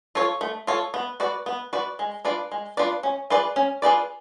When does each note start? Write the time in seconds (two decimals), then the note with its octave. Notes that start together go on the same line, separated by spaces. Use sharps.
0.15 F4 A4 C#5
0.41 A3
0.67 F4 A4 C#5
0.94 B3
1.20 F#4 B4 D5
1.46 B3
1.73 F#4 B4 D5
1.99 G#3
2.25 D4 F4 B4 D5
2.52 G#3
2.77 D4 F4 B4 D5
3.03 C#4
3.30 F4 G#4 B4 D5
3.56 C#4
3.82 F4 G#4 B4 D5